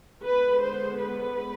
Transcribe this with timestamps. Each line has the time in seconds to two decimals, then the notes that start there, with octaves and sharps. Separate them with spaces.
0.24 D3 G#3 B3 B4
0.62 C5
1.00 B4